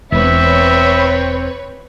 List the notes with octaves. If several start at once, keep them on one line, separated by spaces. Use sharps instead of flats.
E1 C4 B4 C#5 E5